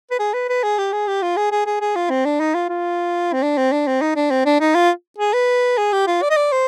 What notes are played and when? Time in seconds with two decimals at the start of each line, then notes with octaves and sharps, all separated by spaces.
0.10 B4
0.19 G#4
0.34 B4
0.49 B4
0.63 G#4
0.78 G4
0.92 G#4
1.07 G4
1.22 F4
1.37 G#4
1.51 G#4
1.66 G#4
1.81 G#4
1.95 F4
2.10 C4
2.25 D4
2.40 D#4
2.54 F4
2.69 F4
3.33 C4
3.42 D4
3.57 C4
3.72 D4
3.87 C4
4.02 D#4
4.16 D4
4.31 C4
4.46 D4
4.60 D#4
4.75 F4
5.19 G#4
5.33 B4
5.78 G#4
5.92 G4
6.07 F4
6.22 D5
6.30 D#5
6.37 D5
6.52 C5